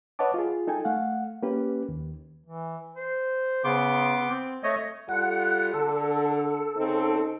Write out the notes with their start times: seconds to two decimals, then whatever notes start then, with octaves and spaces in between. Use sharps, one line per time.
0.19 B4 C#5 D#5 F#5 A5 D6
0.34 F4 G#4
0.67 D#4 A4 G5 G#5
0.85 A3 F5 F#5
1.43 A#3 C#4 G4 B4
1.89 D#2
2.46 E3
2.96 C5
3.64 C#3 B3 C6 D6
4.27 C4
4.63 A3 C#5 D#5
5.09 G3 F4 A4 F#5
5.74 D3 A4
6.76 C#3 C4 D#4